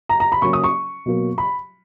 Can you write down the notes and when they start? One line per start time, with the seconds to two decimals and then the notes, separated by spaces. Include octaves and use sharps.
0.09 A#5
0.20 A#5
0.32 B5
0.42 C#3 F#3 A#3 C#4 C#6
0.53 D#6
0.64 C#6
1.06 B2 F#3 A#3
1.38 B5